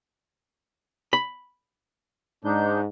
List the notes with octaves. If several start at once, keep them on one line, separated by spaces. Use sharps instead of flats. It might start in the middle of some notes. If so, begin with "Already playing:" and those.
B5
G#2 D4 D#4 G6